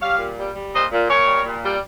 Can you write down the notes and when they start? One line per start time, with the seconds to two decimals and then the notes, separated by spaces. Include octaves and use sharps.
0.01 G3 C#5 F5
0.18 A#2
0.37 G3
0.55 G3
0.72 A#2 C5 D#5
0.91 A#2
1.08 A#2 A#4 C#5
1.27 G3
1.45 A#2
1.63 G3